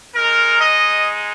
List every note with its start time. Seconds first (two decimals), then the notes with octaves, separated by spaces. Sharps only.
0.15 G#3 D#4 A#4
0.61 D#5